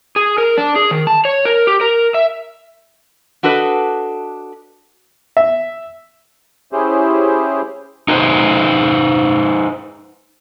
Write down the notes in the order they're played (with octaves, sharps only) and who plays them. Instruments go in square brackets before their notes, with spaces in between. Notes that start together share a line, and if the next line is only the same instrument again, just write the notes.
[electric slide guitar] G#4
A#4
D4
G#4
D#3
A5
C#5
A#4
G4
A#4
E5
[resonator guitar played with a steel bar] D4 F#4 A4 B4 D#5
[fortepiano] E5
[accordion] C#4 E4 G4 G#4 C5
[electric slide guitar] D#4 B4 C5